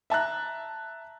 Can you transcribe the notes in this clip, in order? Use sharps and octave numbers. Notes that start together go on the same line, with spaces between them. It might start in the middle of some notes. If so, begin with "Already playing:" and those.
E5 A5 A#5 F#6